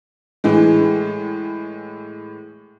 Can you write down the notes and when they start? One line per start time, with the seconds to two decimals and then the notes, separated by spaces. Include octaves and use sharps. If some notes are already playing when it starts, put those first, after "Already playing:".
0.44 A2 E3 G#3